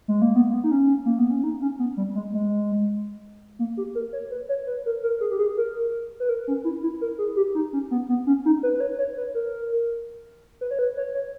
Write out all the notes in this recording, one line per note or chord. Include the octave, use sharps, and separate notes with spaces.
G#3
A#3
B3
A#3
B3
D#4
C#4
A#3
B3
C#4
D#4
C#4
B3
G3
G#3
G#3
A#3
G4
A#4
C#5
B4
C#5
B4
A#4
A#4
G#4
G4
G#4
A#4
B4
A#4
C#4
E4
E4
A#4
G#4
G4
D#4
C#4
B3
B3
C#4
D#4
B4
B4
C#5
C#5
B4
A#4
B4
C#5
B4
C#5
C#5